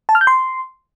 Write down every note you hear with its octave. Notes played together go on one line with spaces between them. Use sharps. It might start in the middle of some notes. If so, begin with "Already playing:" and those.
A5
F6
G6
C6